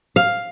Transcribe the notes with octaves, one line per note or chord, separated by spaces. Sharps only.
F5